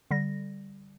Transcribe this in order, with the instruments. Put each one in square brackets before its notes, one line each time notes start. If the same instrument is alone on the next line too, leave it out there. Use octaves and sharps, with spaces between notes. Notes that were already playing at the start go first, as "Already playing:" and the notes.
[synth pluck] D3 G3 A#6